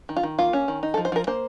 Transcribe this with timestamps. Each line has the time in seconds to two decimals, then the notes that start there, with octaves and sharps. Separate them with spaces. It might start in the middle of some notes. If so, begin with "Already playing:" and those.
0.09 D#3
0.16 F4
0.23 D#3
0.39 A#3 F4
0.53 C#4
0.68 D#3
0.83 D#4
0.94 A4
0.97 F3
1.05 C5
1.12 F3 A#4
1.27 A#3 C5